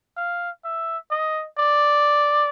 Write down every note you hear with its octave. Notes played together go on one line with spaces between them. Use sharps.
F5
E5
D#5
D5